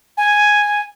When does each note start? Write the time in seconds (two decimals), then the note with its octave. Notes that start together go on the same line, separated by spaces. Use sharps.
0.17 G#5